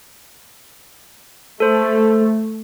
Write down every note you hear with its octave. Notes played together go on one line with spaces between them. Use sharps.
A3 A4 C5